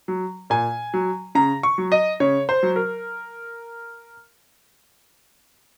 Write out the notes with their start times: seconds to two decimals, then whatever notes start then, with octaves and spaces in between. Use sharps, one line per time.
0.08 F#3
0.50 A#2 G#5
0.94 F#3
1.35 C#3 A#5
1.63 C#6
1.78 F#3
1.92 D#5
2.20 C#3 C#5
2.49 C5
2.63 F#3
2.76 A#4